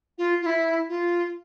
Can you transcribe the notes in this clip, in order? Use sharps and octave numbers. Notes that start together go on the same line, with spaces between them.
F4
F4
E4
F4